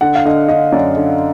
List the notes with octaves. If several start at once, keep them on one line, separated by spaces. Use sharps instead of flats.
D3 F#5
F5
D3 D#5
D3 D#5
F#2 D5
D3